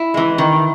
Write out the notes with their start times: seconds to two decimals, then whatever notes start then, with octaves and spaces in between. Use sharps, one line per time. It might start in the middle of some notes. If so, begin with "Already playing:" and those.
Already playing: E4
0.14 E3 G#3
0.38 D#3